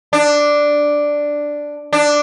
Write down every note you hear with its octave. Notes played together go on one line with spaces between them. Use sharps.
D4
D4